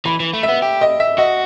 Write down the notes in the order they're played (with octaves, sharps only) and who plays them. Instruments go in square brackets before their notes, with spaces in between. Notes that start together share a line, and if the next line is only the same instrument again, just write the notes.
[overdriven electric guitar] E3 [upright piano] B5
[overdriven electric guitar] E3
A3
[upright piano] E5
[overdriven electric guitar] B3
G4
[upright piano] D#5
E5
[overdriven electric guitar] F#4 [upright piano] D#5